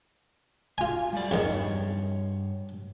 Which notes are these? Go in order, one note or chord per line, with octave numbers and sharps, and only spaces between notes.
F4 G#5
G3 A3 D5
E2 G2 D#3 C#5